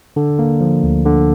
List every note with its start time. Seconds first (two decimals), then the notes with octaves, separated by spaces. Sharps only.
0.16 D3
0.39 A#3
0.61 F3
0.83 D2
1.05 D3